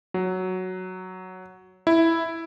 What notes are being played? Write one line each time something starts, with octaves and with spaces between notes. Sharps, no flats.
F#3
E4